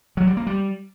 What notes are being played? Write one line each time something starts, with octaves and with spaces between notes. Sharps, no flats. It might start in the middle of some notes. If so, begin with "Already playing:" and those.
F#3
G3
A#3
G3